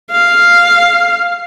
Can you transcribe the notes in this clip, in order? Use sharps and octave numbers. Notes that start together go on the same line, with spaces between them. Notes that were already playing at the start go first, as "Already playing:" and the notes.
F5